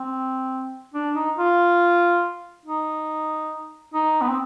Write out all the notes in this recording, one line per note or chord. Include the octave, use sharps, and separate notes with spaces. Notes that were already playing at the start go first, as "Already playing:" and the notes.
Already playing: C4
D4
D#4
F4
D#4
D#4
B3
C4